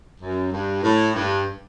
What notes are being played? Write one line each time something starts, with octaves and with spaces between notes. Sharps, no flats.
F#2
G2
A2
G2